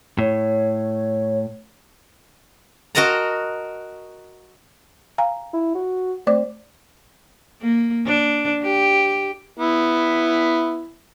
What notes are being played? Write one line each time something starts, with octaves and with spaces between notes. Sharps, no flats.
A2 C#5
F#4 A#4 D#5 A5 A#5
F5 G#5 A#5
E4
F#4
A3 C4 D5 D6
A#3
D4
G4
B3 E4